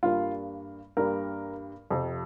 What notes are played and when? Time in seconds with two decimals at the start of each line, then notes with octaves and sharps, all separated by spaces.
0.03 G2 G3 A#3 F4
0.97 G2 G3 A#3 A#4
1.90 F2 C3 F3